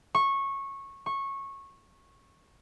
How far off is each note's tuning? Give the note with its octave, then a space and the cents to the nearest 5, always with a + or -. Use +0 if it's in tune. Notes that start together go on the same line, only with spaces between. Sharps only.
C#6 -15
C#6 -15